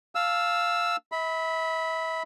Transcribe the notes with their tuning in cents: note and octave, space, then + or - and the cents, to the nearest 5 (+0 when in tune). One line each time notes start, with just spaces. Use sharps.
F5 +0 A5 +0 E6 +0
E5 -35 B5 +0